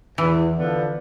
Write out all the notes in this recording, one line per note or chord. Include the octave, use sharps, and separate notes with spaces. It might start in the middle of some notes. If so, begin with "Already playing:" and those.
E2 E3
D3 F3 B3